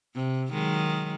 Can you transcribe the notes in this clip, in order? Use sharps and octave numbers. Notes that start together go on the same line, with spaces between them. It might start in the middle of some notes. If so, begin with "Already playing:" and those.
C3
D#3 F#3 G#3